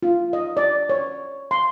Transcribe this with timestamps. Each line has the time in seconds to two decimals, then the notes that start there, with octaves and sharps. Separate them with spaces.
0.03 F4
0.33 D#5
0.57 D5
0.89 C#5
1.51 C6